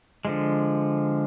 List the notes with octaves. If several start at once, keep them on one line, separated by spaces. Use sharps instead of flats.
D3 F3 G#3